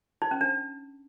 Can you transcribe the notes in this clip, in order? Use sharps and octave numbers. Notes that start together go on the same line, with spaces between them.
D#4
C#4
D4